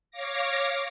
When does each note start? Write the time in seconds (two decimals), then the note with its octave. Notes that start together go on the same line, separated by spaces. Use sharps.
0.11 C#5 F5 D6 A#6